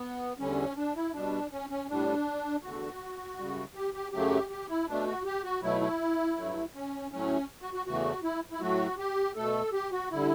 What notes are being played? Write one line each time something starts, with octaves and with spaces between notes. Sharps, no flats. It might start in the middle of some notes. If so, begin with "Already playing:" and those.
Already playing: B3
E2 D3 G3 C#4
D4
E4
B2 G3 D4
C#4
C#4
A2 G3 D4
E2 D3 A3 F#4
F#2 C#3 G3
G4
G4
F#2 C#3 F#3 A3 G4
G4
E4
B2 A3 D4
F#4
G4
F#4
B2 F#3 A3 E4
E4
G2 F#3 A3
C#4
A2 F#3 A3 C#4
F#4
F#4
E2 C#3 E3 A3 F#4
E4
E4
A2 F#3 A3 F#4
G4
B2 A3 A4
G4
F#4
D3 G3 E4